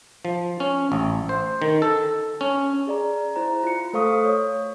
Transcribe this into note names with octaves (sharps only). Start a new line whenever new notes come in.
F3
C#4
A1
C5
D#3
A4
C#4
G#4 D5 A#5
E4 C5 A#5
F4 C#7
A3 A4 C5 F5 C#6 D#6
C#5